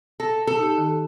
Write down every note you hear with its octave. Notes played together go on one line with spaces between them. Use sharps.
A4 A#6
A4
D#4 G4
D#3